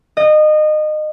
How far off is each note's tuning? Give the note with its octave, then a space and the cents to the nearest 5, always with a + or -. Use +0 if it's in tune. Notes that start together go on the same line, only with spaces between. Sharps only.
D#5 -25